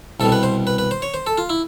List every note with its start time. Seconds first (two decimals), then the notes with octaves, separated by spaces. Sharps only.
0.20 C2 B2 G3 A4
0.32 B4
0.43 C5
0.67 B4
0.78 B4
0.91 C5
1.02 C#5
1.14 C5
1.27 A4
1.38 F4
1.49 E4